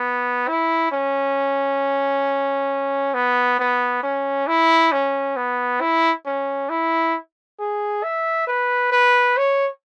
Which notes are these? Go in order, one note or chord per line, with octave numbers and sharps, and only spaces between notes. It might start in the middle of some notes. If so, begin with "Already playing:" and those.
Already playing: B3
E4
C#4
B3
B3
C#4
E4
C#4
B3
E4
C#4
E4
G#4
E5
B4
B4
C#5